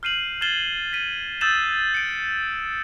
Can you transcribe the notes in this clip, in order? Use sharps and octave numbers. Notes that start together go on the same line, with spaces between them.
F6 G6 C7 D#7 E7 F#7
F6 G#6 A6 C7 E7 G7
B6 D#7
D#6 E6 G6 A6 E7 F#7
C#7 D7